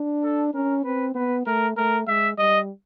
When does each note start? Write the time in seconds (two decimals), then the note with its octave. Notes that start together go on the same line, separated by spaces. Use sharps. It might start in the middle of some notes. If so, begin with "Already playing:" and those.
Already playing: D4
0.23 A4
0.54 C#4 A#4
0.84 C4 B4
1.15 B3 B4
1.46 A3 A#4
1.77 A3 A#4
2.07 G#3 E5
2.38 G3 D#5